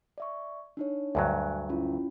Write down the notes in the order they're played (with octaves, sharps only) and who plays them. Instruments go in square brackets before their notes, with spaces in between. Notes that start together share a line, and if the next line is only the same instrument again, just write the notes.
[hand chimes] D5 E5 C#6
D4 D#4 C#5
[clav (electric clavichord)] D2 G2 F#3 [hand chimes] G#5 F#6
[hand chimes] C#4 E4 F4